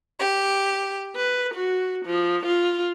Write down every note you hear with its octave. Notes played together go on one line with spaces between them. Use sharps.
G4
B4
F#4
F3
F4